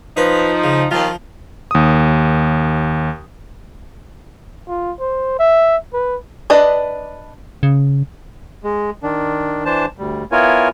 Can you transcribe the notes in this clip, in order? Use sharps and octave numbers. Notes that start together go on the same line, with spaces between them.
F3 D#4 B4
C#3
D#2 D#3 F3 F4
D#2 D#6
F4
C5
E5
B4
D4 B4 D5 D#5
C#3
G#3
D#3 D4
E3 D4 C5 A5
D2 G3
B3 E4 F4 A#4 C#5 G#5